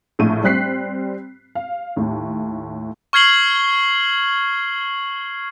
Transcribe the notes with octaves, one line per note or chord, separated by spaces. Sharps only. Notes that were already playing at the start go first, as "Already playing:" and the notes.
A#1 A2 D#7
G3 C4 F#6 B6 C7
F5
D#2 A2
C#6 F6 G#6 C7 F#7 G7